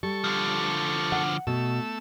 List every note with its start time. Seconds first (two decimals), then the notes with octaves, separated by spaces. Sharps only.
0.03 G3 A4 C#6
0.24 D3 F3
1.12 F#5
1.47 B2 A3 E6